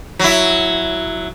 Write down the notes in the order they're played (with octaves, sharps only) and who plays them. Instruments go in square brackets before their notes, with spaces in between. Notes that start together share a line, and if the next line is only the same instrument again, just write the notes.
[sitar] F#3 E4